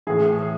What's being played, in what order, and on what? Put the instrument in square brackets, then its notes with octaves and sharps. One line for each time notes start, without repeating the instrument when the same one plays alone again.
[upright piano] A2 E3 G#4